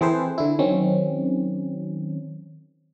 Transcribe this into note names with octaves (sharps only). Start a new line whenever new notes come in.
E3 C4 G#4 A4 B4 C5
D3 E4
D#3 F#3 C4 C#4